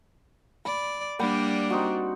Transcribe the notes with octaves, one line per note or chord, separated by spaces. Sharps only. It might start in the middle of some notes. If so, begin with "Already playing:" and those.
D5 B5
G3 A#3 D4 F#5 G5 B5
C4 D#4 F#4